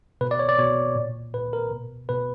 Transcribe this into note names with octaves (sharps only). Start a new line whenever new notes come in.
B2 B4
D5
C#5
D5
B2 C#5
A#2
A#2 B4
A#4
B2
B2 B4